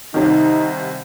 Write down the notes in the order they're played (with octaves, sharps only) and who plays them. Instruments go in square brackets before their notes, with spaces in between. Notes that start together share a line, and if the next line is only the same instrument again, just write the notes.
[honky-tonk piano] C2 C3 D#3 [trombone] D#4